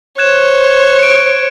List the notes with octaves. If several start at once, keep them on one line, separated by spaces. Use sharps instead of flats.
C5 C#5 F#6 G#6 E7
C#7 D7